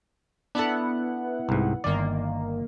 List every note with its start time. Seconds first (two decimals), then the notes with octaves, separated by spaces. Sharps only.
0.55 B3 D4 E4 A4 F#5
1.49 C2 G#2
1.84 G1 D#3 A#3 D5